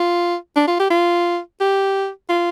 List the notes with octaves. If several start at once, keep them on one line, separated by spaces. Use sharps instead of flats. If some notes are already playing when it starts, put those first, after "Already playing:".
Already playing: F4
D4
F4
G4
F4
G4
F4